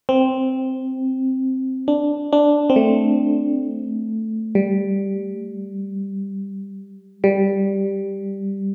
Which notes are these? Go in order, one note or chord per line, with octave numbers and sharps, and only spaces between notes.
C4
D4
D4
C4
A3
G3
G3